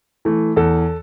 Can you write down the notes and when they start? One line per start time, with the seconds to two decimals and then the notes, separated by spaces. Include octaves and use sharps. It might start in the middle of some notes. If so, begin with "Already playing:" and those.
0.25 E3 A3
0.56 E2 A4